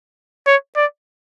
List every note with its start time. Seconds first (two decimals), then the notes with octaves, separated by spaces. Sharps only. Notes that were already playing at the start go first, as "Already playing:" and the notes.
0.47 C#5
0.76 D5